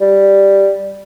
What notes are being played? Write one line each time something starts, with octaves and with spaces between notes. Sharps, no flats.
G3